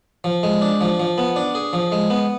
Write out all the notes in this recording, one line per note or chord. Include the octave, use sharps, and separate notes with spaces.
F3
G#3
D4
F3
F3
B3
D4
G#4
F3
G#3
B3